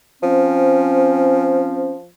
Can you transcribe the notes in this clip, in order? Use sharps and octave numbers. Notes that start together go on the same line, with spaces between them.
F3 C4 C#4